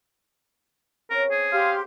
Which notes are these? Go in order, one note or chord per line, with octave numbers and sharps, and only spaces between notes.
C#3 C4 A#4 C#5
G#4
G4 F5 C6